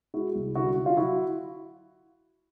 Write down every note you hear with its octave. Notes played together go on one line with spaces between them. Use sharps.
G#3 E4 F#4
C2
D3 E4 F#4
D3
F4
F#3 E4 F#4